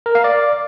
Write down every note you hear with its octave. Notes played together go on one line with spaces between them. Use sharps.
A#4
F5
D5